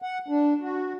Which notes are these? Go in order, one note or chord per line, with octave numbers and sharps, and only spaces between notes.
F#5
D4
F#4